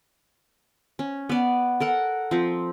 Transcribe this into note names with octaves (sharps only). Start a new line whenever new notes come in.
C#4
B3 D5
A4 A#4 F#5
F3 C4